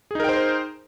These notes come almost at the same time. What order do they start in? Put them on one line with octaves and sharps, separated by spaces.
G#4 D#4 A#4 G5 C5